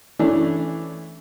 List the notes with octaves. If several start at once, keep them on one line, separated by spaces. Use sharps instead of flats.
E3 A3 C#4 D4